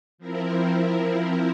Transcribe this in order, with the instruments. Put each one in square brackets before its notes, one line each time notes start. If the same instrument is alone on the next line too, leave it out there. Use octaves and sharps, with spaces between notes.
[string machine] F3 C4 E4 A#4